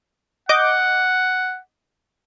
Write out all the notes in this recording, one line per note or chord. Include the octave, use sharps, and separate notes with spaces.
D#5 F#5 D6 G6